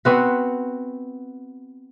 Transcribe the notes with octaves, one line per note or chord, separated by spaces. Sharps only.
B3 C4 F#4